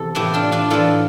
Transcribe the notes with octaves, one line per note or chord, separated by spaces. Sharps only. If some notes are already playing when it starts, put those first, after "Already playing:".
Already playing: E2 C3 A4
A2 E3 E4 G4
D4 F4
D4 F4
A2 E3 F4 A4